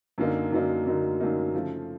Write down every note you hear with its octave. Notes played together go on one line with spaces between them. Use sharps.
F#2 D3 F#3 A#3 D#4
F#2 D3 F#3 A#3 D#4
F#2 D3 F#3 A#3 D#4
F#2 D3 F#3 A#3 D#4
C#3 F3 A3